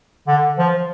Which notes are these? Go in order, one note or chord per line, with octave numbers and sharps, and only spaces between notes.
D3
F3